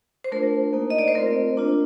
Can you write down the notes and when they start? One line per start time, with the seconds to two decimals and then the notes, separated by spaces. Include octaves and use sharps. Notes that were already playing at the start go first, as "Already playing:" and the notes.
0.24 C5
0.32 A3 D4 F4 A#4
0.73 A#3 D#4
0.90 D#5
0.98 D5
1.08 C5
1.15 A3 C4 F4 A#4
1.57 A#3 D4 F4